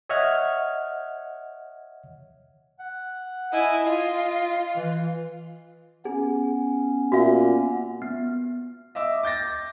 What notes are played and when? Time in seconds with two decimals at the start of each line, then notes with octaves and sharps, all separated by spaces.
0.09 C#5 D#5 E5 F#5 F6 G#6
2.79 F#5
3.52 E4 D#5 G#5
3.86 F4 D#5
4.77 E3
6.05 B3 C#4 G#4
7.12 A#2 F#4 E5
8.02 B3
8.95 D#5 E5 D6 E6
9.23 D6 G6 A6 A#6